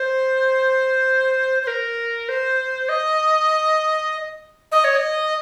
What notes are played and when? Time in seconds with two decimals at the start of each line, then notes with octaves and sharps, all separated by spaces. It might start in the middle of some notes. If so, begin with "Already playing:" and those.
Already playing: C5
1.63 C5
1.67 A#4
2.29 C5
2.89 D#5
4.72 D#5
4.84 C#5
4.95 D#5